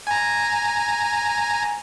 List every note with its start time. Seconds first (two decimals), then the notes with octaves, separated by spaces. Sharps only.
0.07 G#5 A#5